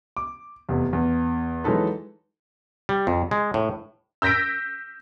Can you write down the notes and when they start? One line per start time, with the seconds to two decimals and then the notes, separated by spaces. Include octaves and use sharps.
0.17 D6
0.69 F1 E2
0.93 E2
1.64 E3 F#3 G#3 D#4 A4 B4
2.89 G3
3.07 F2
3.31 G#3
3.54 A2
4.22 E6 G6 A#6 B6 D7